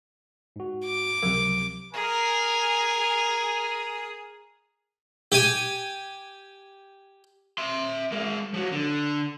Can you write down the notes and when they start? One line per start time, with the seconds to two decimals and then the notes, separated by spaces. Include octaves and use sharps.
0.56 G#2 F#4
0.85 D6
1.22 C#2 C3 F3 F#3 A#4
1.93 G#4 A#4 G#5
5.32 G4 G#5
7.58 E5 C6
8.12 G#3 A#4
8.54 F3 F#4
8.72 D3